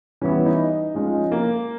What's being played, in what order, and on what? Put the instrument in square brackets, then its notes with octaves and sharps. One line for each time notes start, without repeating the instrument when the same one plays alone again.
[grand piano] E3 G3 B3 E4 [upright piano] C#4
[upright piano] D#4
[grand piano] F3 G#3 C#4 F4
[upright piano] A#3